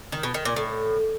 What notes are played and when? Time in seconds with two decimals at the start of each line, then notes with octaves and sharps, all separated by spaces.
0.12 D#3
0.23 B2
0.34 D#3
0.45 A#2
0.56 A2